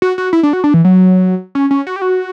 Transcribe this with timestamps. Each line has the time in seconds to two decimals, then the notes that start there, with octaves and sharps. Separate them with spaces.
0.02 F#4
0.18 F#4
0.33 E4
0.43 D4
0.53 F#4
0.64 D4
0.74 E3
0.85 F#3
1.55 C#4
1.71 C#4
1.87 F#4
1.96 G4
2.02 F#4